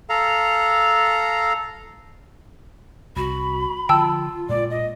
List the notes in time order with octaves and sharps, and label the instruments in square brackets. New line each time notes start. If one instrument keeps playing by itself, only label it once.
[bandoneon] A4 F5 A#5
[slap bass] C2 [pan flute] F#4 [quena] B5
[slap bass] D3 F3 [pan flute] F4 [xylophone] G5 A5 E6
[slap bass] A#2 G#3 [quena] D5
[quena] D#5